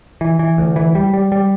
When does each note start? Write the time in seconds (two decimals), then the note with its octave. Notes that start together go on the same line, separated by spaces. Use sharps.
0.21 E3
0.39 E3
0.58 D2
0.76 E3
0.95 G3
1.14 G3
1.32 G3